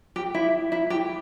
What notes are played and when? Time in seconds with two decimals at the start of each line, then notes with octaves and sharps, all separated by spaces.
0.16 G4
0.34 E4
0.72 E4
0.90 G4